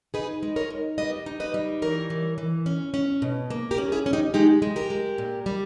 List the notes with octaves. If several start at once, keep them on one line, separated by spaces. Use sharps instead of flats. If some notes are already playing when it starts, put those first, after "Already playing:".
D#4 G#4 B4
G#3
A#4 C#5
D#3
G3 B4 D#5
D#4
B4 D#5
G3
E3 A#4 C#5
E3
E3
C#4
C#4
B2
A#3
G4 A#4
C#4
E4 G#4
C#4
D#4 G4
G#3 D#4 G4
G#3
G4 A#4
G#3
A#2
G3